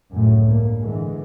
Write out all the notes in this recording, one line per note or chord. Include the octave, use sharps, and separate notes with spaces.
C#2 F#2 A2
G2 A#3
D3 E3 G#3